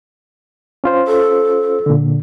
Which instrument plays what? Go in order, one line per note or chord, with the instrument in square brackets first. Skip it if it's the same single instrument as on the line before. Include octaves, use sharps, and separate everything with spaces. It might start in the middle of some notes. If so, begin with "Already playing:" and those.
[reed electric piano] C#4 F4 C5
[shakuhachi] A4
[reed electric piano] A#2 D3